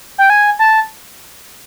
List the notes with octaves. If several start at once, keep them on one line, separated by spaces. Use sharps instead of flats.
G5
G#5
A5